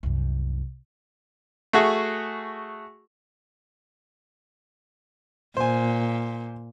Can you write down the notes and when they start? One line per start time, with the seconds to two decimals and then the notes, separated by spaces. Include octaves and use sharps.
0.03 C2 F#2
1.73 A3 F#4 G#4
5.57 A#2 C5 G#5